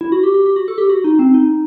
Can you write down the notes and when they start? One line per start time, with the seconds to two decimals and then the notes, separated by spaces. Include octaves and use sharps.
0.01 E4
0.12 F#4
0.23 G4
0.34 G4
0.46 G4
0.56 F#4
0.68 A4
0.78 G4
0.89 F#4
1.04 D#4
1.19 C4
1.34 D#4